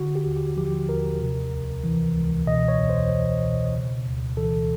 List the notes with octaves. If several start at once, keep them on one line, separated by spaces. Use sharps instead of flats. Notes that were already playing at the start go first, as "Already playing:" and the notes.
Already playing: D3 F#4
G4
D#2
G4
F3 G4
D#2 A#4
C3
C#2
E3
C#2
B2 D#5
C#5
E2
C5
E2
B2
C#3
D2
E3 A4